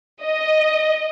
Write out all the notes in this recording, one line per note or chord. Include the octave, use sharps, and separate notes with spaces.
D#5